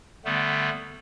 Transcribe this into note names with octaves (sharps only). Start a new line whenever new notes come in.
D3 G3 A3 B3